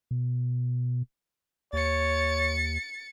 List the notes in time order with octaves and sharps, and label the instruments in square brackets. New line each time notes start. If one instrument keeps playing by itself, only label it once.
[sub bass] B2
[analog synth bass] D#2 [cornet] C#5 [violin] A6 C#7